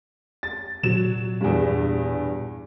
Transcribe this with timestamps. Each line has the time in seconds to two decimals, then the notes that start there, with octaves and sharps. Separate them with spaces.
0.43 A6
0.83 A#2 F#3 E7
1.41 E2 G2